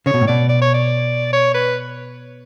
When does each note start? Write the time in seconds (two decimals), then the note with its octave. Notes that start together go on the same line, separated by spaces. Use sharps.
0.06 C#3 C#5
0.14 B2
0.21 A2
0.27 B2 D5
0.49 D5
0.61 C#5
0.74 D5
1.33 C#5
1.54 B4